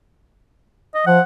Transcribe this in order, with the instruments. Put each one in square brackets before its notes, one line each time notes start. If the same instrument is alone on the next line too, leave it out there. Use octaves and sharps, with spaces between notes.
[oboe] D#5
[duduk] F3 [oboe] F#5